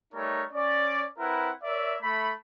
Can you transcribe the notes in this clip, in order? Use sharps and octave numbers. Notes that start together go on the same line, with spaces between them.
G3 A3 D#4 A#4 C#5
C#4 D5
C4 E4 A#4 B4 F#5
A#4 C#5 D5 E5
A3 B5